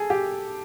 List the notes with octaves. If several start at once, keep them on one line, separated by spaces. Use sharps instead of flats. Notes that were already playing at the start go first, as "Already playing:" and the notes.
Already playing: G#4 A4
G4